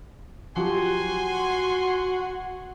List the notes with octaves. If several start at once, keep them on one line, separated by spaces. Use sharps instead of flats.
F3 F#3 F#4 G4 G#5 C6